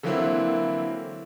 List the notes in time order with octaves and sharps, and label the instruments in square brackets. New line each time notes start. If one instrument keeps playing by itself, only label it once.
[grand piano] D3 E3 F#3 A#3 C4 E4